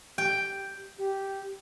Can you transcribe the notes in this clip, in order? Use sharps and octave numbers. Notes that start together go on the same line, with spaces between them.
G4 G5
G4